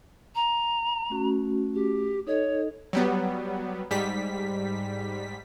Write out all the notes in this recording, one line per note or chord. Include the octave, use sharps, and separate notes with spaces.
A#5
A3 C#4 F#4
G4
D#4 A4 C#5 D#5
F#3 G3 B3
G#2 G3 B6